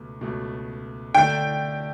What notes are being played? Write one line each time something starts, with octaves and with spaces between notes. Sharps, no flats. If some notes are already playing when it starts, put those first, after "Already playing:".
Already playing: C#2 B2 A3
C#2 B2 A3
D3 A3 D4 G5